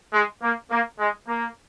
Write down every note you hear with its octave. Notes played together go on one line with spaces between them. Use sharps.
G#3
A#3
A#3
G#3
A#3